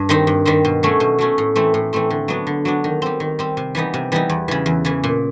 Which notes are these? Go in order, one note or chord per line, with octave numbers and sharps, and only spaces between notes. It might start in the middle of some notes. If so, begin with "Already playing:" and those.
Already playing: G2
D#3 G3 C4 D#4
G2
D#3 G3 C4 D#4
B2
F#3 A3 C#4
B2
F#3 A3 C#4
A2
E3 A3 C4
A2
E3 A3 C4
D3
F#3 B3 D4
D3
F#3 B3 D4
D#3
G3 C4
D#3
G3 C4
C3
E3 G3 B3 D#4
C3
E3 G3 B3 D#4
E2
C#3 E3
E2
C#3 E3
A#2